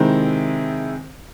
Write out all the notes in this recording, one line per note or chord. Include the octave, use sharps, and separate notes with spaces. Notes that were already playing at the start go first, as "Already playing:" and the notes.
Already playing: C3 D#3 G#3 C4 E4